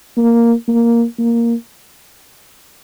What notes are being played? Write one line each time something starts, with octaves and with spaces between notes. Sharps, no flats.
A#3
A#3
A#3